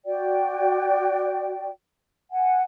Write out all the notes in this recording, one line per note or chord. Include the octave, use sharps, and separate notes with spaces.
F#4 D5 G5
F#5 G#5